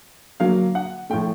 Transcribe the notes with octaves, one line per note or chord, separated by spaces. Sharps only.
D3 F#3 A#3 F5
F#5
A2 F3 A3 G5